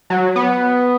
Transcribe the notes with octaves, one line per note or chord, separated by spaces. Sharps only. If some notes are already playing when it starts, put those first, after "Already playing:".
F#3
B3